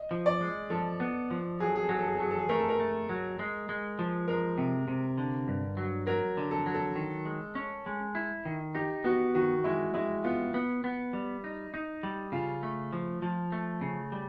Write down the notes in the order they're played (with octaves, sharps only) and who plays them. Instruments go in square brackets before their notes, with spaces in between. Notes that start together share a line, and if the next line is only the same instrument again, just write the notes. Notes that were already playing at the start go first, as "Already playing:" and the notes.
Already playing: [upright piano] D#5
[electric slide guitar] F3
[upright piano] D5
[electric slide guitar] G#3
[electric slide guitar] F3 [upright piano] A4
[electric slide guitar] B3
F3
[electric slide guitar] F#3 [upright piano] G#4
[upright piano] A4
G#4
A4
[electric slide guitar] F#3 [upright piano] G#4
[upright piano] A4
G#4
A4
[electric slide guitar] F#3 [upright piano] G#4
[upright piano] A4
G#4
[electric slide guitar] A3 [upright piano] A#4
[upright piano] A4
A#4
[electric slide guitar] A3
F#3
G#3
G#3
F3
[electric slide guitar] G#3 [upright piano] A#4
[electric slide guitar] C3
C3
D3
G2
F#3
[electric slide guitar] F#3 [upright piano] A#4
[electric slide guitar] D3
[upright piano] A4
[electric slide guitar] F#3
[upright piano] A4
[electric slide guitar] D#3
G#3
C#4
G#3
E4
D#3
[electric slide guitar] D#4 [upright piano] G4
[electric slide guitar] B3 [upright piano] F#4
[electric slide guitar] D#3 [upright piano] F#4
[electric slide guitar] G#3 [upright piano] E4
[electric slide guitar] G#3 [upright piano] E4
[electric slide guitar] B3 [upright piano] F4
[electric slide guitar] B3
B3
G3
D#4
D#4
G3
[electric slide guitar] C#3 [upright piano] F4
[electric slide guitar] A3
F3
F3
A3
C#3
G3